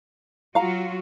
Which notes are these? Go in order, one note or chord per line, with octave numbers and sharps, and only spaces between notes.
F#3 F4 F#4 F5 A#5